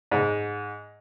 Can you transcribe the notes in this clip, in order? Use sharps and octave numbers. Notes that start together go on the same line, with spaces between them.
G#2